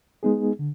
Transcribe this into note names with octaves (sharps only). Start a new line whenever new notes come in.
G#3 B3 D#4 G#4
D3